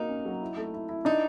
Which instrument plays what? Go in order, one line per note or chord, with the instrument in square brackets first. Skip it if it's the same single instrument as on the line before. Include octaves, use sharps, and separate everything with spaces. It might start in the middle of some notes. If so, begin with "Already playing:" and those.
Already playing: [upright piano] A#3 F#4 [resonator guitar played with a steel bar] D#4
[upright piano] C#4
F#3
E4
A3
E4
E4
[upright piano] D4 [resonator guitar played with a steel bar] D#4